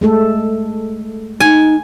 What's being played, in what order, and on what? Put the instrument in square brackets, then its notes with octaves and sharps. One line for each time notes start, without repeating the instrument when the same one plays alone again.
[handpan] G#3 A3 A4
[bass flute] D#4 [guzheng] G#5